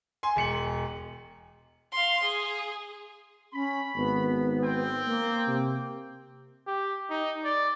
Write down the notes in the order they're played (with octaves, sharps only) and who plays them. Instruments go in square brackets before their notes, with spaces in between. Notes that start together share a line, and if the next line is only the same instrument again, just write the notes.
[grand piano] G#5 C6
E1 C#7 F#7
[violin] F5 C6
G#4
[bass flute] C#4 [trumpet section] B5
[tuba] G#1 [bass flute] B3
[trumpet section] C4 G5
[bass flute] A#3
[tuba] C3
[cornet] G4
D#4
D5